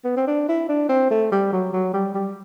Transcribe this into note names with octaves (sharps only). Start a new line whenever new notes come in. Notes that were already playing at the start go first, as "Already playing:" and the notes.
B3
C4
D4
E4
D4
C4
A3
G3
F#3
F#3
G3
G3